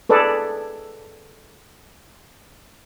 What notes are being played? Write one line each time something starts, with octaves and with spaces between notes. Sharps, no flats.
G#4 A4 B4 D5